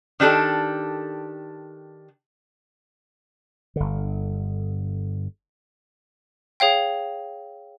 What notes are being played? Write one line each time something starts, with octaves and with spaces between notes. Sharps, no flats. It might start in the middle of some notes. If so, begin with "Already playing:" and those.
D#3 D4 G4 A4
G1 D3
G#4 C#5 F5 G5